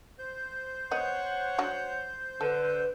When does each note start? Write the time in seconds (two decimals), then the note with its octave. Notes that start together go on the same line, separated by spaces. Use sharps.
0.19 C5 G6
0.91 B3 C#5 D#5 F#5
1.58 F#3 D4 F#4
2.41 D3 A4 B4